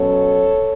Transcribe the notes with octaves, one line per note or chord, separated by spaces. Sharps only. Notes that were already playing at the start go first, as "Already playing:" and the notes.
Already playing: B2 F#3 C#4 A4 C#5